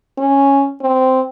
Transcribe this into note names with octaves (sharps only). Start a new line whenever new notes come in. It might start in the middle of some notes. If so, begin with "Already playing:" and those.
C#4
C4